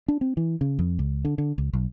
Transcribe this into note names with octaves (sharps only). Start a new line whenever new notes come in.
D4
C4
E3
C#3
F2
C#2
D3
D3
C#2
B1